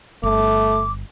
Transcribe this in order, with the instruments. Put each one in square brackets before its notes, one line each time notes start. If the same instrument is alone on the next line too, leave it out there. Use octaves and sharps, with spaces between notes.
[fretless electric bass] G1 [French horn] A3 [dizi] D6